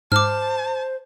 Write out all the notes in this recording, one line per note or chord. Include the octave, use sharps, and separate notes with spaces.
G#2 C5 A5 D6 F6